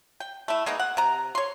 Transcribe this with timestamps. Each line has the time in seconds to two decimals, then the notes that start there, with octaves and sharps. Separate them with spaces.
0.20 G5
0.48 A3 E4
0.66 G#3 A#3 B3 D#4
0.79 F#5
0.97 C3 A#5
1.35 C#5 C6